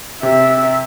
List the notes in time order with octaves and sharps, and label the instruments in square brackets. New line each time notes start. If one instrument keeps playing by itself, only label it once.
[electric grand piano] C3 [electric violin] E5